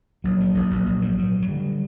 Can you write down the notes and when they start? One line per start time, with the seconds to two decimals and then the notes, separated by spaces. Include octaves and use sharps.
0.24 A#1 F#3
0.40 G#2
0.55 A#1
0.71 A#1
0.86 A#1
1.01 G#2
1.18 G#2
1.33 G#2
1.42 F#3
1.49 D3 G3